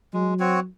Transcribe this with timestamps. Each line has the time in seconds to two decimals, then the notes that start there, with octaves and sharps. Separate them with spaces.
0.14 F#3 G#3
0.40 C4 F#4 C#5